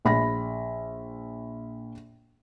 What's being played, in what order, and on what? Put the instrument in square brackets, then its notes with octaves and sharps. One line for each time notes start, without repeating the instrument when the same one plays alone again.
[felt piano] A#1 B5 A#6